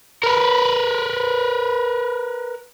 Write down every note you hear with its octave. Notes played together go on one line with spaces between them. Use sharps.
A#4 B4